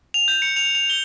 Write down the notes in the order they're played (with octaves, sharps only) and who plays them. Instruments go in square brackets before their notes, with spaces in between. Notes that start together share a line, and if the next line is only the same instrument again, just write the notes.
[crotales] F7
G6
C#7
F7
F7
G7